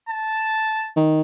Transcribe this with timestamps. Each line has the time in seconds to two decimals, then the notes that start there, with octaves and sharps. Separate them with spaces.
0.09 A5
0.97 D#3